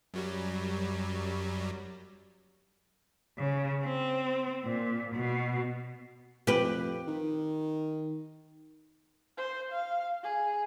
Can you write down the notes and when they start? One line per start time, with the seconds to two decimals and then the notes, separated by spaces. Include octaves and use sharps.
0.14 F#2 F#3 G3
3.38 C#3
3.85 C4
4.65 A#2
5.15 B2
6.47 F2 G4 B4
7.08 D#3
9.37 C5
9.71 F5
10.23 G#4